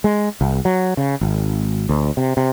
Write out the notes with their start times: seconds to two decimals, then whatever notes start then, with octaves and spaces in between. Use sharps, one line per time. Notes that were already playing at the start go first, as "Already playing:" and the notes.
0.04 G#3
0.41 C2
0.65 F#3
0.97 C#3
1.21 G#1
1.89 D2
2.17 C3
2.37 C3